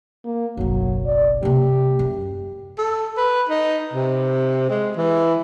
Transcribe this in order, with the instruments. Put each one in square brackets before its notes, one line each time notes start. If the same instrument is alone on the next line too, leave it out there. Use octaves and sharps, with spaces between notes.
[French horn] A#3
[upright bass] F#1 B1 [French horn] F#3
[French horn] D5
[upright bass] C3 A#3 [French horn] G4
[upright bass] F#2
[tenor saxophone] A4
B4
D#4
C3
G#3
E3